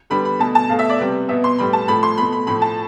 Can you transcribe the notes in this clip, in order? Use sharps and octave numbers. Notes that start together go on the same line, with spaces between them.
D3 G3 B3 B5
B5
B2 A3 A5
A5
B2 A3 F5
E5
D5
C3 G3 B3
B2 B3 E5
C6
A2 G3 B3 B5
A5
A2 F3 A3 B5
C6
B2 A3 B5
B5
A2 F3 A3 B5
A5